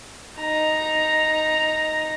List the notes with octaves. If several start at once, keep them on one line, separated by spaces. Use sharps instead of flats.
D#4 A#5